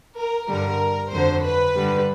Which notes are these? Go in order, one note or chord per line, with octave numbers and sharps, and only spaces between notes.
A#4
G2 D3 G3 A#4
F2 D3 F#3 C5
B4
G2 D3 G3